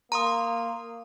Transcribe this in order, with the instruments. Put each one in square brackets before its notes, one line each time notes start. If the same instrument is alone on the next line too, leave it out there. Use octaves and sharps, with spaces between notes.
[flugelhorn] A#3 [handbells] A#5 C6 D#6